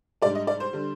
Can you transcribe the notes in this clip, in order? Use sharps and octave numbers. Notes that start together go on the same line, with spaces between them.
G#2 G3 D4 D5
D#5
D5
C5
D3 G3